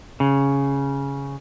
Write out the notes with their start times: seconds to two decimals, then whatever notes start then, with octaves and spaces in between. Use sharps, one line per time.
0.20 C#3